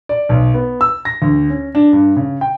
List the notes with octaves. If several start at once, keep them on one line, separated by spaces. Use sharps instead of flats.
D5
B1
B3
E6
A#6
D2
C#4
D4
G2
C#3
G5